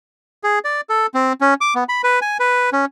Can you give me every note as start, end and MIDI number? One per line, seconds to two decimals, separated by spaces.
0.43 0.59 68
0.65 0.81 74
0.89 1.06 69
1.14 1.33 60
1.41 1.54 61
1.61 1.74 86
1.75 1.84 59
1.89 2.02 83
2.04 2.19 71
2.22 2.37 80
2.40 2.70 71
2.73 2.85 61